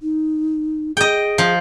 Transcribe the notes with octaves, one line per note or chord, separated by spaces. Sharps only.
D#4
G#4 D#5 G5
F3